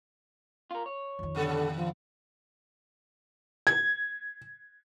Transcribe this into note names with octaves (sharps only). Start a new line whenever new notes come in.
F4 A#4
C#5
F2 D#3
G2 A#2 D3 A4
F3
G#6